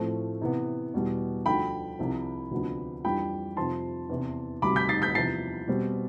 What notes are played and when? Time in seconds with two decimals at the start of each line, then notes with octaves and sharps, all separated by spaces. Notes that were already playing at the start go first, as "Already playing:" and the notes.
Already playing: A2 F3 A3 C4
0.41 C3 E3 B3
0.94 E2 B2 G3
1.46 D2 D3 F3 G5 B5
1.99 C2 C3 F3
2.51 D2 C3 F3 B3 D4
3.04 F2 E3 G3 D4 G5 B5
3.57 F2 C3 F3 C4 A5 C6
4.09 E2 C3 E3
4.62 D2 C3 G3 B5 D6
4.76 G6 B6
4.89 A6 C7
5.02 G6 B6
5.15 E2 C3 F3 A6 C7
5.68 B2 G3 C4